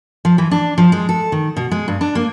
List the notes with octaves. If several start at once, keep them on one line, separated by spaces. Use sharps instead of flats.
F3
E3
D4
F3
G#3
A4
D#3
B2
G#3
G2
D4
A#3